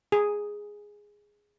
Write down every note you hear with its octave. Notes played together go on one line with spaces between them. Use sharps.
G#4